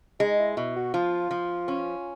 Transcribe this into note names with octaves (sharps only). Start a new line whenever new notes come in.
G#3 D#4
E4
B2 E4
F#4
F3 F4
F3
C#4